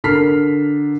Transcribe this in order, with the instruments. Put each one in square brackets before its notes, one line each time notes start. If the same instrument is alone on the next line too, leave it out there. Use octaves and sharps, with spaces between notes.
[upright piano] D3 A#4 A5 F6 B6 C7